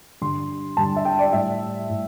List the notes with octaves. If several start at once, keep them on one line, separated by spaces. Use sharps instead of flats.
G2 D3 G3 C6
G2 D3 G3 A5
E5
G5
D5
A2 G3 E5
A2 G3